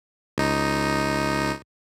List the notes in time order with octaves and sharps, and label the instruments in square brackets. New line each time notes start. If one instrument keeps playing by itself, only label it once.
[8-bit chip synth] C#2 D#4